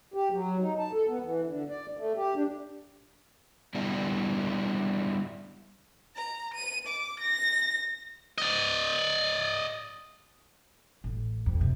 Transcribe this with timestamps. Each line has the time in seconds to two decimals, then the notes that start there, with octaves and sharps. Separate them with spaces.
0.14 G4
0.31 F#3
0.60 D#4
0.78 A5
0.92 A4
1.08 B3
1.23 E3
1.45 D3
1.69 D5
1.97 A3
2.16 G4
2.35 D4
3.75 G3 B3 D4 E4 G4 D5
6.16 A#5
6.54 D#7
6.87 D6
7.20 A#6
8.38 D5 D#5
11.04 A1
11.46 F2
11.61 C3